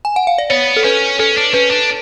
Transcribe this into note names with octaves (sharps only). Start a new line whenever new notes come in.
G#5
F#5
F5
D5
B3 C#5
A4
C#4 B4
C#4 A4
D4
C#4 B4
D4